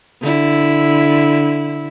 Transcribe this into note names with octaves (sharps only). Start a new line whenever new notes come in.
D3 E4